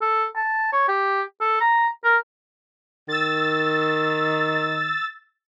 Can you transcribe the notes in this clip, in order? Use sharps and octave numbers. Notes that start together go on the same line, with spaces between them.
A4
A5
C#5
G4
A4
A#5
A#4
D#3 E6 A6